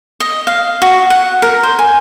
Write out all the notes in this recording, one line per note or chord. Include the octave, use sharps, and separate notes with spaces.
D#5
F5
F#4
F#5
A#4
C5
G#5